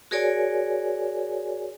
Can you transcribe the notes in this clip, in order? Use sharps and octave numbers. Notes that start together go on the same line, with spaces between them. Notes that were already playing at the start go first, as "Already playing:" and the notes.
F#4 G#4 A#4 C#5 D5 G#5